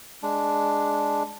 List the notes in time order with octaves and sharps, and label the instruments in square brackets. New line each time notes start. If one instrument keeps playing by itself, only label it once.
[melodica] G#3 D4